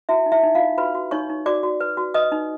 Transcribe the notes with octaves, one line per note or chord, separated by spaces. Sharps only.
E4 F#4 E5
D#4
E4 E5
D#4
F4 F5
D#4
F#4 B4 B5
F#4
D#4 C#5 C#6
D#4
F#4 D5 D6
F#4
B4
F#4
B4 D#5 D#6
D#4